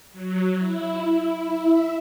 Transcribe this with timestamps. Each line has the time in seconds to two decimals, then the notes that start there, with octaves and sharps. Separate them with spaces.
0.12 F#3
0.59 E4
1.09 E4
1.68 E5